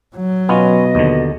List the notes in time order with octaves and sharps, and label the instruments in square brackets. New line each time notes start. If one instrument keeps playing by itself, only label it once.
[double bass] F#3
[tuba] B2 [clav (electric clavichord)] B3 C#4 F4 [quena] D#5
[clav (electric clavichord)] D#2 D3